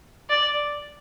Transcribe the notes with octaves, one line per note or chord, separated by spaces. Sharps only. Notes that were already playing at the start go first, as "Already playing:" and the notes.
D5